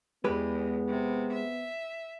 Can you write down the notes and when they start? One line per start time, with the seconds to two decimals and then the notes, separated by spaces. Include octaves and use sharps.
0.24 E2 G#3 B3 G4 B4
0.87 C3
1.32 E5